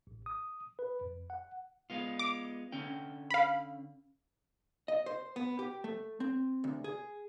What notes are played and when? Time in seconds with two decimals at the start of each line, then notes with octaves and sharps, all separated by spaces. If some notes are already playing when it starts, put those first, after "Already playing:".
0.07 A1
0.26 D#6
0.79 B4
1.01 F2
1.30 F#5
1.90 G#3 B3 F4
2.19 D6
2.72 D3 C#4 G5
3.31 F5 B5
4.88 D#5
5.06 C5
5.36 B3
5.59 G4
5.84 A3
6.20 C4
6.64 D2
6.84 G#4